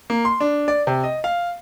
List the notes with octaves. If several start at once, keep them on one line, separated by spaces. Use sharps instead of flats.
A#3
C6
D4
D5
C3
D#5
F5